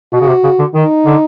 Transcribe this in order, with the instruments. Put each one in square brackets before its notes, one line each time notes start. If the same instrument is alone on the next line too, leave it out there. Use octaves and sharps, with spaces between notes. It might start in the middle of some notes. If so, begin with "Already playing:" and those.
[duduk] B2 [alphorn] F#4
[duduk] C#3
C3
C#3
D3
[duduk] D#3 [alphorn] D#4
[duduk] D3